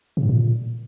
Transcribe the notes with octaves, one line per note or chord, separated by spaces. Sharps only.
C3
G#2
A#2